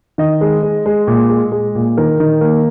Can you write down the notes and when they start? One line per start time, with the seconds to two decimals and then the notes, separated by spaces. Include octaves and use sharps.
0.18 D#3 D#5
0.41 G#3
0.63 G#3
0.86 G#3
1.07 A#2
1.30 G#3
1.52 G#3
1.75 A#2
1.97 D#3 A#4
2.20 D#3
2.41 A#3